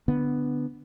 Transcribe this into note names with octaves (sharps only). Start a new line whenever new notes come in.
D3 B3